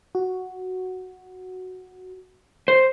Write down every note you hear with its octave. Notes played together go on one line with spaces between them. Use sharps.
F#4
C5